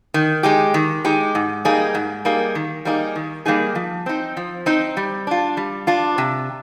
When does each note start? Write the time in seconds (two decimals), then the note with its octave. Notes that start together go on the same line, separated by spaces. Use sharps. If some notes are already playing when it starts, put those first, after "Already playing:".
0.14 D#3
0.43 G#3 D#4 G4
0.74 D#3
1.04 G#3 D#4 G4
1.35 G#2
1.65 G3 A#3 D#4 G#4
1.95 G#2
2.25 G3 A#3 D#4 G#4
2.55 D#3
2.85 G3 A#3 D#4 G#4
3.16 D#3
3.45 G3 A#3 D#4 G#4
3.75 F3
4.06 C4 D#4
4.37 F3
4.66 C4 D#4
4.97 G3
5.27 D4 F4
5.57 G3
5.87 D4 F4
6.18 C3